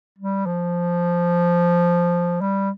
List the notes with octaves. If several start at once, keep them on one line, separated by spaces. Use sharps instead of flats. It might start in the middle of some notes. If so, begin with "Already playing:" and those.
G3
F3
G3